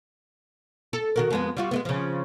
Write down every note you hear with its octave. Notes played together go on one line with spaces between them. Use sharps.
A4
D#3 F#4 A#4
F2 G#3 B3
G3 F4 F#4
G#3 A3 B3
C#3 F3